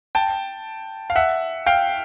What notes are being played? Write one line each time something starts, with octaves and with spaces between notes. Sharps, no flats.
G5 A5
F5
E5 F#5
F5 G5